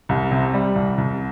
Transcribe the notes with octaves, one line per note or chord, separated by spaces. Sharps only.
C2
C3
G3
C2
C2